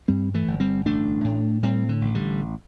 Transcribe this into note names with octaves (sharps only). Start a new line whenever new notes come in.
G2 G3 C4
E3 A3
G1
G3 C4
A1 A3 D4
A2
A2 G3 C4
D3
A1
D3 G3